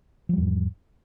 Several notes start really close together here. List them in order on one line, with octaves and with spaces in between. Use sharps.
F3 G3 E2 G#2